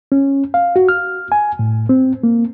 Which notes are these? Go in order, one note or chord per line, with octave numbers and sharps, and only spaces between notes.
C#4
F5
F#4
F6
G#5
A2
C4
A#3